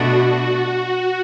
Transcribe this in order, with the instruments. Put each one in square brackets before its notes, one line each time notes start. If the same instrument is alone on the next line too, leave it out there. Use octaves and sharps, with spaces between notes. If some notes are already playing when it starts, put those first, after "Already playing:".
Already playing: [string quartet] B2 A3 D4 [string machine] F#4